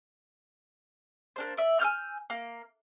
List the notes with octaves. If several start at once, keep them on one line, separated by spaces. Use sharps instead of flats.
A#3 D4 C5
D5 E5
G#5 E6 F6 G6
A#3